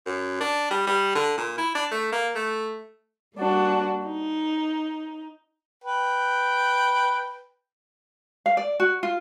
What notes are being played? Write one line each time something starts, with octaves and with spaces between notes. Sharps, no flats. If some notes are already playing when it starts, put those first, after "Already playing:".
F#2
D4
G3
G3
D3
A#2
E4
D4
A3
A#3
A3
G3 A#3 D4 F#4
D#4
B4 G5
F5
D5
F#4
F4